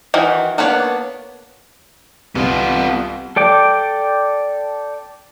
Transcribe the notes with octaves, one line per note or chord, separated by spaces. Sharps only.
D#3 E3 F#4
A#3 B3 D4 B4 C#5
C2 B3 F4
A4 D5 G5 D6